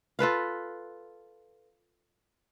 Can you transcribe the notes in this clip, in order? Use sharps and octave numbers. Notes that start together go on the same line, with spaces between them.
F4 A4 B4 F5